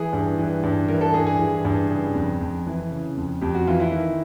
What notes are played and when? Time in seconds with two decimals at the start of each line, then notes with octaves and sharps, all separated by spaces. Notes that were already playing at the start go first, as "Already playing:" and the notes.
Already playing: E3 G#4
0.13 G2
0.38 E3
0.63 G2
0.88 E3 A#4
1.01 A4
1.14 G2 G#4
1.27 G#4
1.39 E3
1.65 G2
1.90 C#3 G#4
2.15 F2
2.41 F2
2.67 E3
2.91 C#3
3.17 F2
3.42 F2 G4
3.54 F#4
3.67 E3 F4
3.80 E4
3.92 D#3